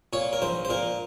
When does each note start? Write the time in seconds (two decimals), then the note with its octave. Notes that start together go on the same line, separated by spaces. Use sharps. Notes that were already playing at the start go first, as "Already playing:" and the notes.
0.13 A#2 C#5
0.33 A#4
0.42 A#1 C5
0.65 C5
0.70 A#2 A#4